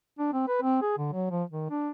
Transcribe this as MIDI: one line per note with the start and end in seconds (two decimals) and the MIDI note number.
0.19 0.29 62
0.33 0.47 60
0.48 0.58 71
0.62 0.79 60
0.82 0.94 68
0.98 1.09 50
1.13 1.27 54
1.31 1.43 53
1.50 1.70 51
1.70 1.91 62